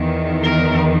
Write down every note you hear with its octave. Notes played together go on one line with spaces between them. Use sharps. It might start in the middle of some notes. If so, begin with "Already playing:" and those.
Already playing: E2 D#3
A#4